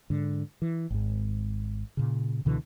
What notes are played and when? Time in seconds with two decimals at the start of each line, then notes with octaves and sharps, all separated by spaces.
0.10 G#2 D3
0.62 E3
0.90 G#1 G#2
1.97 A#2 C#3
2.45 C#2 B2 D3 E3